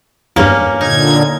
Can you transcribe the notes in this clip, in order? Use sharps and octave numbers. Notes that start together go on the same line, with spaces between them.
E2 G2 A#3 C#4
A#2 D3 D#4 G#6